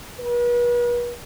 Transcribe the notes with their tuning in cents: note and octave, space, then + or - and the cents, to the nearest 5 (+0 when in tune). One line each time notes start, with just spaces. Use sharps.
B4 -40